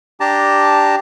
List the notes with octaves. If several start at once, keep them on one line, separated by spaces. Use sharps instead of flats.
D4 G4 A5 A#5